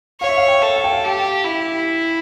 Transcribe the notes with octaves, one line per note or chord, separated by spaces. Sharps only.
C#5 F5
E5
F5
G5
A4
F5
G5
F5
G4
E4